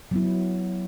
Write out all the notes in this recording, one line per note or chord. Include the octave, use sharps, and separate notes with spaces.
F#3 B3 E4